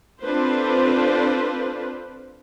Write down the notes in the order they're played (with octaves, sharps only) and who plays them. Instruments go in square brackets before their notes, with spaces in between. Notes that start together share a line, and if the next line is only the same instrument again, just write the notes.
[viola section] C4 D4 F4 A4 B4 C5